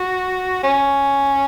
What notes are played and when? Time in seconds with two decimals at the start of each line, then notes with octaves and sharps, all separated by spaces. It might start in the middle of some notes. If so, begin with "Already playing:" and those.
Already playing: F#4
0.63 C#4